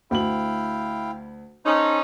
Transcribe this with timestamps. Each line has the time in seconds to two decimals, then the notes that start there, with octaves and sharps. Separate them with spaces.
0.11 D2 E4 F5 G5 F#7
1.65 C#4 D#4 A4 C5